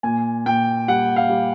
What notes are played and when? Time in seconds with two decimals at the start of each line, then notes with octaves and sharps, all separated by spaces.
0.03 A#2 G#5
0.46 A#2 G5
0.88 G3 F#5
1.16 F5
1.29 G3